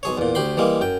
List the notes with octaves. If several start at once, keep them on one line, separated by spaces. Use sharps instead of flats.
B1 G#4 C#5
E2 A#2
D2 G4 B5 C6
E3 G3 G#3 A#3
F#2 G5